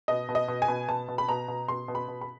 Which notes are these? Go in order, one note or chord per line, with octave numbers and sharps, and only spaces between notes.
B2 D#5
B2
D#5
B2
G#5
B2
B2 A5
B2
B5
B2 A#5
B2
B2 C6
B2
B5
B2
B5